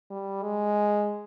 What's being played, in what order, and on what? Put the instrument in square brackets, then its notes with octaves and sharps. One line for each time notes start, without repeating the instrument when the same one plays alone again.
[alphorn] G3
G#3